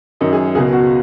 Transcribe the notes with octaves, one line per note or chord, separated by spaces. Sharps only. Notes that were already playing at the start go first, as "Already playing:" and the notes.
F#2 D#3 D#4
G#4
C#2 B2 G#4
F#4